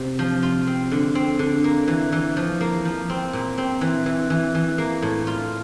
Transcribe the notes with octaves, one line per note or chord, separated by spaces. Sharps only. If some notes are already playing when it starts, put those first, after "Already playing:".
Already playing: C3
F3
F4
C4
D3
C4
D3
A#3
E3
E3
F3
A#3
F3
C4
A#2
C4
E3
E3
E3
E3
A#3
A2
F4